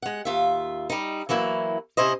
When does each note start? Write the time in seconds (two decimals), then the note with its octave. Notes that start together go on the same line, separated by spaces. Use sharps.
0.02 G#3 F#5
0.25 D#2 F4 E5
0.90 G3 D#4
1.29 E3 F#3 A#3 E4
1.97 C3 C#4 E4 C5 D#5